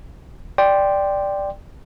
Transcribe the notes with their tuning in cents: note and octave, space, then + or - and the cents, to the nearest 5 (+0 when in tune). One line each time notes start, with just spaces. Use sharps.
D5 +0 G5 +0 C6 +0